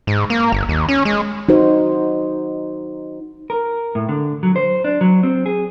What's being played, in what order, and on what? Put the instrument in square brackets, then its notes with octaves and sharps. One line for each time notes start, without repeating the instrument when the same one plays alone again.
[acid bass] G#2
A#3
G1
D#2
C#4
G#3
[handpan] D#4 F#4 C5
[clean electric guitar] A#4
A2
D3
F#3
C5
D4
F#3
C4
G#4